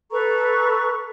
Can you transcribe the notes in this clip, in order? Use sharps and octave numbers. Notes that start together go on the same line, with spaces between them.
A4 B4 A#5 C#6